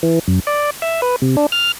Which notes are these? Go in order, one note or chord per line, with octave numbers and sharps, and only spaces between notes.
E3
F#2
D5
E5
B4
C3
D4
F6